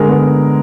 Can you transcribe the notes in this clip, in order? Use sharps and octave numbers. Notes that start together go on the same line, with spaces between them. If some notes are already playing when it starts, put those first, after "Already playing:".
Already playing: D3 G#3 A#4
B3